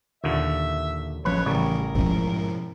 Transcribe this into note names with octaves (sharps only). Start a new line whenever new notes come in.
D#2 A#2 D3 E5
A1 F3 C#4 B4 C#5
A1 C#3 E3 G3 A#4 C#5
G#2 B2 F3 C#4